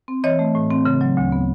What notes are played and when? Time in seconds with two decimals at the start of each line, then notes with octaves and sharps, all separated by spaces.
0.08 C4
0.24 E3 C#5 D#5
0.39 A3
0.55 A2
0.71 C4
0.85 C#3
1.01 F#3
1.17 D2
1.32 B3